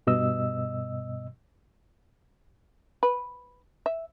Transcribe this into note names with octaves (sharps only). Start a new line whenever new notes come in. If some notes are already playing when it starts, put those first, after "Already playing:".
G2 B2 D#5 E6
B4
E5